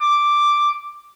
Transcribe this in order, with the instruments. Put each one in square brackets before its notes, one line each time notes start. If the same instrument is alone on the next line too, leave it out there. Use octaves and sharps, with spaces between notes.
[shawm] D6